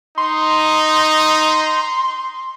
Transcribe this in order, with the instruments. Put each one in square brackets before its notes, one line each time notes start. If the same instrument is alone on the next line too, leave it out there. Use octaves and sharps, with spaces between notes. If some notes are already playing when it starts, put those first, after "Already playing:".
[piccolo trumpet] D#4 [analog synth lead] C6